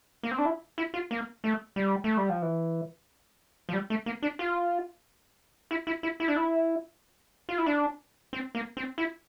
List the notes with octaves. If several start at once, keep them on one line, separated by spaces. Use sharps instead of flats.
A#3
C4
D4
E4
E4
F4
A#3
A3
G3
A3
G3
F3
E3
F3
G3
A3
A#3
D4
F4
E4
E4
E4
E4
D4
E4
F4
E4
D4
C4
A#3
C4
E4